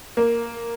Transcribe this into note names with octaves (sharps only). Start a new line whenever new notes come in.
A#3